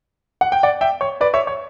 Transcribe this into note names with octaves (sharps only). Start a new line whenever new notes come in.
F#5
G5
D5 F#5
E5 G5
C#5
B4 D5
C#5 E5
C#5